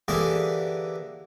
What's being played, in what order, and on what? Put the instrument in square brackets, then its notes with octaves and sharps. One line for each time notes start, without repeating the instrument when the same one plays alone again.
[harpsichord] D3 E3 A#3 G4 G#4